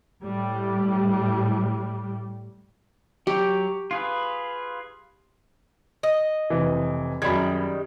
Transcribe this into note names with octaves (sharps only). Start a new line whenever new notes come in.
A2 G3
F#3 G4
F4 G#4 B4
D#5
F1 E3
F#2 D#3 G3 G#3 B5 G#6